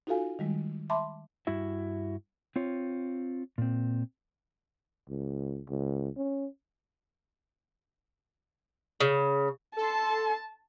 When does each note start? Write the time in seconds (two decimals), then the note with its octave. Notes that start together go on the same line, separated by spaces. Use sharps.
0.07 D#4 F4 F#4 A4 F5 G#5
0.39 D#3 G3 G#3
0.90 E5 A5 B5 C6 D6
1.47 G2 E4 F#4 E5
2.56 C4 F4 C#5
3.58 A#2 C4
5.09 C#2
5.69 C#2
6.17 C#4
9.00 C#3
9.77 A4 A5 C6